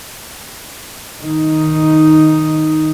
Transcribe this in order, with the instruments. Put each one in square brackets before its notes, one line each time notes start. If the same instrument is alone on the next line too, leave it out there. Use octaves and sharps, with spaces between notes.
[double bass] D#3 D#4